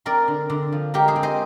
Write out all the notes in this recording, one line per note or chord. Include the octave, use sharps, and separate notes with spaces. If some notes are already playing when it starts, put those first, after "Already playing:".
C4 A#4 D5
D3
D3
F3
G#3 G4 A#4
G#4 C5
C4
C5 D#5